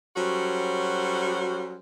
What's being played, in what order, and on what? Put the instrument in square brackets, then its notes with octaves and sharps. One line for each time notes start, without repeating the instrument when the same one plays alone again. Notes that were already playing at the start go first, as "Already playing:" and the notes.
[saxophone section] F#3 G3 C#4 F#4 A4 C5